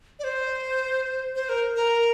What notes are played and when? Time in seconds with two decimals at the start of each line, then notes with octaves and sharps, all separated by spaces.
0.19 D5
0.24 C5
1.35 C5
1.49 A#4
1.76 A#4